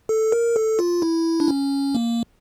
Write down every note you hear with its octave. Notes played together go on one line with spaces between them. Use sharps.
A4
A#4
A4
F4
E4
D4
C#4
A#3